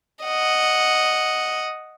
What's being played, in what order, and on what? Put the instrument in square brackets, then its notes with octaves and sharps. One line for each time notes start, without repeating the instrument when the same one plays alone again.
[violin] D#5 F#5